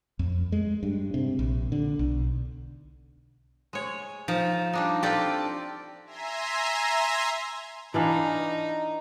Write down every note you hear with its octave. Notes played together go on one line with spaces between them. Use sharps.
F2
G#3
G2
C3
A#1
D3
B1
G#3 C#5
F3 D#4
G3 D4 D#4
C4 D4 F4 G4 A4 D5
E5 G#5 A#5 C6
E3 D4 D#4 F5